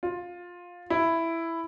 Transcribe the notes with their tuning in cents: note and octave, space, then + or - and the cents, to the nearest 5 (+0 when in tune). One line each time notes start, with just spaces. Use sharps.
F4 +15
E4 +5